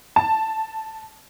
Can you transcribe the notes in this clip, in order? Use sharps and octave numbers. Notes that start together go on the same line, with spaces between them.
A5